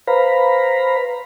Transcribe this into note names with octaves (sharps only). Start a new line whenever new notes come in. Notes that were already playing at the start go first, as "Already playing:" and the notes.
B4 C5 F5 A#5 B5